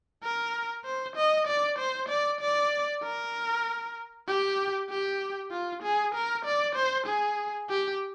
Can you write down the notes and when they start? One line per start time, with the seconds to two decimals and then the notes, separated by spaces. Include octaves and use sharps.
0.23 A#4
0.85 C5
1.16 D#5
1.47 D5
1.78 C5
2.09 D5
2.41 D5
3.03 A#4
4.28 G4
4.90 G4
5.51 F4
5.83 G#4
6.15 A#4
6.45 D5
6.76 C5
7.07 G#4
7.70 G4